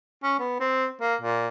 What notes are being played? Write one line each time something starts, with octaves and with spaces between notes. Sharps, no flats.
C#4
B3
C4
A#3
A#2